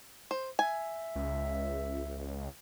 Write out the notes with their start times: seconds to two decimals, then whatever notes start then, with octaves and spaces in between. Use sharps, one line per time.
0.31 C5
0.59 E5 G#5
1.15 C#2